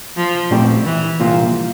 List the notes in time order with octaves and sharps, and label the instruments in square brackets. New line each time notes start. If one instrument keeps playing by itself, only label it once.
[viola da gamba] F3
[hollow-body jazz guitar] A#2 A3 C4 G4 D5
[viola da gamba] E3
[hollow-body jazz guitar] C2 A#2 F3 A#3 F4